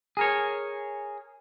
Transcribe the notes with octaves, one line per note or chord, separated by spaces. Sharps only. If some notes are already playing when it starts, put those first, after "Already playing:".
G#4 A#4 C#5